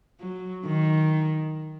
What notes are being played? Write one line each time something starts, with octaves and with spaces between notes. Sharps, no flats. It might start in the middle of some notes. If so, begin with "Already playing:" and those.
F#3
D#3